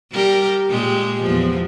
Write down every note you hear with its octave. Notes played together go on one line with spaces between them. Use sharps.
G3 G4 A#4
A#2 G#3 G4
E2 F3